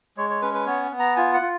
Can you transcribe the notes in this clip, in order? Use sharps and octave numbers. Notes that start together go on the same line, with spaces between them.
G#3 C#5
C#5
C#4 B4
B4
B3 C#5
B3
A#5
F4 G#5
F#5
F4